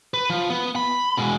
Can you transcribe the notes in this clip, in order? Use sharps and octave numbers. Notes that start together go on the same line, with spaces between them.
B4
F3
B3
B5
B2 G#3